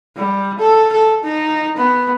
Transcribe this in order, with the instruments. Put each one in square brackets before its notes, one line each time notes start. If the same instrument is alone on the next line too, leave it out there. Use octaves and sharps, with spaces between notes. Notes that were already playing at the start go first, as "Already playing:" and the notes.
[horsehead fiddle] G3
A4
A4
D#4
B3